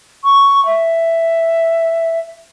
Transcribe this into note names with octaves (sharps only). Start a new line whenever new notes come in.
C#6
E5